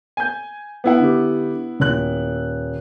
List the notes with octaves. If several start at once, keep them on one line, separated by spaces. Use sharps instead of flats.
G#5 G6
B3 E4 F#5
D3 G4
D#1 F#6